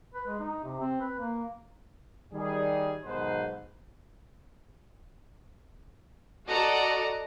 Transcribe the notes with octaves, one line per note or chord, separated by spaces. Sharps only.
B4
G#3
D#4
C3
C4
B4
A#3
D#3 G3 G#4
B1 G#2 B2 D#3 B4 C5
F#4 A4 D5 D#5 A#5